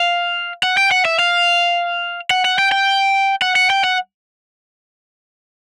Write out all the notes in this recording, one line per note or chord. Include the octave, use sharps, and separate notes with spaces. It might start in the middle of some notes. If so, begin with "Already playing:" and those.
Already playing: F5
F#5
G5
F#5
E5
F5
F#5
F#5
G5
G5
F#5
F#5
G5
F#5